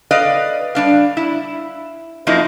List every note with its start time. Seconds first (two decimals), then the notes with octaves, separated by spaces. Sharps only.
0.11 B4 D5 D#5 F5
0.75 G3 D4 F5
1.17 E4
2.27 F#2 F3 A#3 D#4 E4